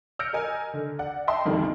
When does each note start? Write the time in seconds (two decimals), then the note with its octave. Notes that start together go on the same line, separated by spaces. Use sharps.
0.19 E6 F6 G6 A#6 C#7 D7
0.33 A#4 D#5 G#5
0.74 D3
0.99 D5 F#5
1.27 D#5 E5 F#5 G5 A5 C6
1.45 B1 F2 D3 D#3 G3